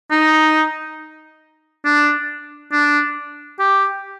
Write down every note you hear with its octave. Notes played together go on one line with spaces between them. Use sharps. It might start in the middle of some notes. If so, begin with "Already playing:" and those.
D#4
D4
D4
G4